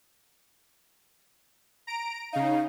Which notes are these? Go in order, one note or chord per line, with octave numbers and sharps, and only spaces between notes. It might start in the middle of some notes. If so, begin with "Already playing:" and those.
A#5 D7
C#3 D#4 F5